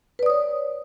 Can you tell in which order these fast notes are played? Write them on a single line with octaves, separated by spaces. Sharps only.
B4 D5 D#6 C#5